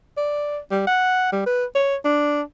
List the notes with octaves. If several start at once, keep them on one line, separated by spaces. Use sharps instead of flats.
D5
G3
F#5
G3
B4
C#5
D4